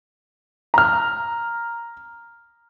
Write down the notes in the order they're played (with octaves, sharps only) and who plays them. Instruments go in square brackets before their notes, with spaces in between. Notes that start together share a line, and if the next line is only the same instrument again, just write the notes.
[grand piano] A#5 F6